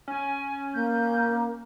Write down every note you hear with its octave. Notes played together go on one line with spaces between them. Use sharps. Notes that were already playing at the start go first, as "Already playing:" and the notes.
C#4 G#5
A#3 G6